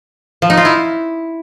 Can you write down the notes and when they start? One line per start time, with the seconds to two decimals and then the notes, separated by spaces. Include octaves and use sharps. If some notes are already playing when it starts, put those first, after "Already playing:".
0.42 F3
0.50 D#4
0.57 F4
0.65 E4